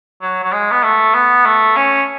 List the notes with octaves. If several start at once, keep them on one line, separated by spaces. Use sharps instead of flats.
F#3
F#3
G#3
B3
A3
B3
A3
C#4